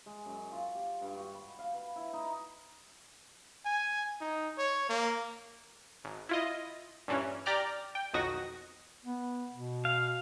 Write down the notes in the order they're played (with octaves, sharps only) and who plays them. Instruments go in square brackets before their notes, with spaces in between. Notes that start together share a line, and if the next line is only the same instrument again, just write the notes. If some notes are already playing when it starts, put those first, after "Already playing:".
[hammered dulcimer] G#3
F#2
F4
G4
G2
F#4
B5
F5
B4
E4
D#4
[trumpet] G#5
D#4
C#5
A#3
[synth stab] G#1
E4 F4 D#5
G2 A#2 E3 C#4
G4 D5 G5 A#5 D6 F6
G5
B1 F2 D#3 F#4 D#6 A#6
[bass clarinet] B3
B2
[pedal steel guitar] F5